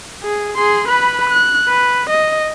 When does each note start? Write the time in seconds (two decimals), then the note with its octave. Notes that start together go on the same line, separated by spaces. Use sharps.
0.23 G#4
0.56 G#4 C6
0.88 B4 B5
1.30 F#6
1.68 B4
2.10 D#5